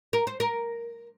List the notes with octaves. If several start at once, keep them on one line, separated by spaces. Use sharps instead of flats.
A#4
C5
A#4